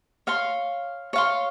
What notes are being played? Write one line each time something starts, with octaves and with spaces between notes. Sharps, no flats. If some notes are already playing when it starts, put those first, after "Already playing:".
C#5 F5 C6
C#5 F5 C6